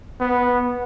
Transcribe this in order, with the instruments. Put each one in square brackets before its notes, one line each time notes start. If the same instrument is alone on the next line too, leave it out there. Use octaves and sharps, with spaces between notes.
[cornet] B3